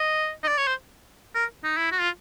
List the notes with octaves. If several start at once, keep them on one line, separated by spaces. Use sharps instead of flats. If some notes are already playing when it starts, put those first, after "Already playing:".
Already playing: D#5
D#5
D5
C#5
C5
A#4
D#4
E4
F#4
F4